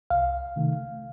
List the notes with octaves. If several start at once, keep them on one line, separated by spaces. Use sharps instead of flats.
C2 F5
C3 D#3 A3